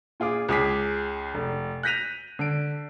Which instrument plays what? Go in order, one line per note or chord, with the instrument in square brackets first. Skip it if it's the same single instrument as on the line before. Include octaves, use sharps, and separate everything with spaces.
[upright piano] A#2 F4 G#4 D6
C#2 G#4 D6 B6
F1
F#6 G6 A#6 B6 D#7 F7
D3 D7